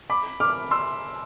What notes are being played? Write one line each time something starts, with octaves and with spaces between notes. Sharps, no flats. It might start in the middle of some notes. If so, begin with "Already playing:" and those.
B5 D6
D6 F6
C6 E6